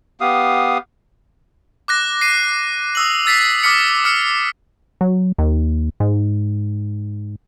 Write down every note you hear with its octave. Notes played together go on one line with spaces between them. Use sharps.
B3 G4 F5 D#6
D6 F#6 A#6
C7 D#7
D#6 E6 F#7
E6 A6 B6 C7
D6 D#6 F6 B6 C#7
D#6 F6 C#7
F#3
D#2
G#2